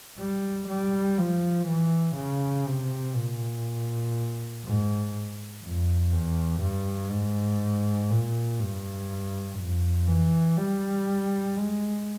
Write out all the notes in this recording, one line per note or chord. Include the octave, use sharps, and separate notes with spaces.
G3
G3
F3
E3
C#3
C3
A#2
G#2
F2
E2
G2
G#2
A#2
G2
F2
E3
G3
G#3